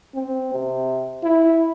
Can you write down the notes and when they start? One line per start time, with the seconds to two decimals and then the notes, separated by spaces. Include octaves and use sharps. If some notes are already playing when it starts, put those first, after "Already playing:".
0.15 C4
0.53 C3
1.24 E4